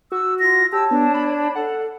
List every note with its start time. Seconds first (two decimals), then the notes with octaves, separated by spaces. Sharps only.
0.12 F#4 E6
0.39 F4 A#6
0.73 G4 C#5 A5 E6
0.91 B3 D4
1.14 B5
1.55 A4 F#5